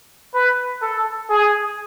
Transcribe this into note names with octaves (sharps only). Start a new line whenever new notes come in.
B4
A4
G#4